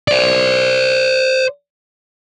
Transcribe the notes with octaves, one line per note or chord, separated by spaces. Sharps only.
C5 D5